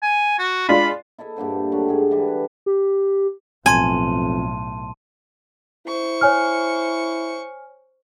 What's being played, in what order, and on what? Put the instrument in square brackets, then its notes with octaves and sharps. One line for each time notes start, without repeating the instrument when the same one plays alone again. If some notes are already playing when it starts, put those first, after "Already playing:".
[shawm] G#5
F#4
[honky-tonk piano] G#3 D4 F4 [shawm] B5
[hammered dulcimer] E4 A4 D#5 E5
G2 A#2 D3 C5
F#3 A3 D4 G4
G#2 G#4
D3 E3 G3
B4
[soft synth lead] G4
[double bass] B1 A2 [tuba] F2 [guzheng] G#5 [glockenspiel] A5 C6 D#7
[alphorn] E4 [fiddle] C5 C#6
[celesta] C#5 G#5 F6